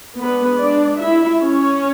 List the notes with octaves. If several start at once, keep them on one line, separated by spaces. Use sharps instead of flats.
G#3 B3 D4 B4
D4 D5
E4 E5
C#4 C#5